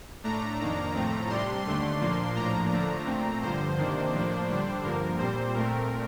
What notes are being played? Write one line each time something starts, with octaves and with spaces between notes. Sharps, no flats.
A2 A3 D4 A#5
F2 D#3 A#3 D4
A2 F3 A3 C4
C3 G3 D4 C6
D#2 D3 A3 D4 C6
A#2 F3 A#3 D4
A2 F3 A#3 D4 A#5
D3 F3 A3 D4
A#2 A3 C4
G2 D3 F3 C5
C3 D#3 A#3 D4
A2 F3 A#3 D4
D3 G3 D4
G2 D3 F3 A#3 A#4
A#2 G3 C4 C5
A#2 A3 C4 A#4